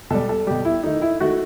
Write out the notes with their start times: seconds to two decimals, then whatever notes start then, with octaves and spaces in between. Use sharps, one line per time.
0.10 B2 G3 A4
0.29 A4
0.47 B2 G3 G4
0.65 E4
0.83 D#3 A3 D#4
1.02 E4
1.20 D#3 A3 F#4